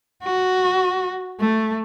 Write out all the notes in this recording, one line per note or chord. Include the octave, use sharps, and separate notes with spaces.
F#4
A3